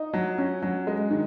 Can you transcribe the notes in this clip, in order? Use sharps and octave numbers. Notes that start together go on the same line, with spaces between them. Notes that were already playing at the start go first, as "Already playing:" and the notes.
Already playing: D#4
F#3
C#4
F#3
G#3
D#3